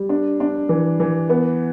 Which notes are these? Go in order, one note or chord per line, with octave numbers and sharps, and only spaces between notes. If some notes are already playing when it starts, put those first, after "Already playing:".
Already playing: G3
D4
D4
E3
E3
B3